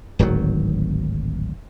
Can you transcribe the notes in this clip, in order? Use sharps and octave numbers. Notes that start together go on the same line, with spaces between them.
D1 G#1 D#3 F#3